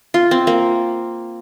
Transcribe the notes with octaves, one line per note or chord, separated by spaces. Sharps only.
F4
C4
A#3